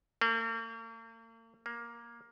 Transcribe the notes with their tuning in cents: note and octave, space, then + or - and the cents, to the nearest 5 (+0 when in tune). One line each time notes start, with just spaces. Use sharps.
A#3 -45
A#3 +10